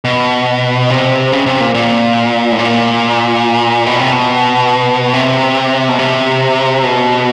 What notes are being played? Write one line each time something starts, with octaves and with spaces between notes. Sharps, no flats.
B2
C3
C#3
C3
A#2
A#2
A2
A#2
B2
C3
B2
C3
B2
C3
B2